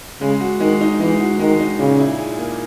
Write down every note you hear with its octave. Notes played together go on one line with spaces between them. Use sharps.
C#3 G#3
F#4
D#3 G#3
D#4
E3 G#3
F#4
D#3 G#3
D#4
A#2 C#3
E4
G#4
A#3